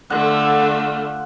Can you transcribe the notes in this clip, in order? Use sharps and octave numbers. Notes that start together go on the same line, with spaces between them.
D3 A3 F4 F#5